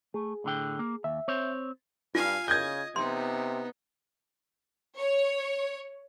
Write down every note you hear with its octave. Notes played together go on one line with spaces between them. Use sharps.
A3 G#4
A2 D3 G5
A#3
D#2 E5
C4 C5 C#5
G2 F4 F5 G#5
C#3 D#5 G6 G#6
C3 B3 D#4 C6
C#5